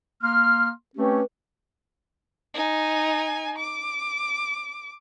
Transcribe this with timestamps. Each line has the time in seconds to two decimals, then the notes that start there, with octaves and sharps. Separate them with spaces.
0.22 A#3 C6 F6
0.96 A3 C4 C#4 G4 B4
2.54 D#4 G#5
3.58 D6